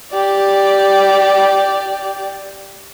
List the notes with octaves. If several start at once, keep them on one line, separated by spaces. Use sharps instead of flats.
G4 D5